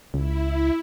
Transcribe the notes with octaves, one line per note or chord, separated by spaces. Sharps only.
C#2 E4